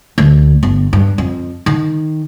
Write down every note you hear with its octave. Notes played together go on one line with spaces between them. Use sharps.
D2
G1
G2
F2
D#3